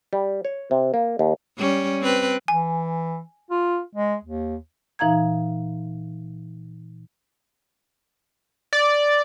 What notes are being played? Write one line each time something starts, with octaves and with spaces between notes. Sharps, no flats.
G3
C#5
C3
A#3
D#2
G3 C#4
C4 B4
E3 G#5
F4
G#3
D#2
A#2 E3 D#4 F5 A#5 G#6
D5